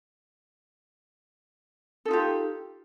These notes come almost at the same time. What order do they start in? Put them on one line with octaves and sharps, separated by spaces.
A4 D#4 F4 G4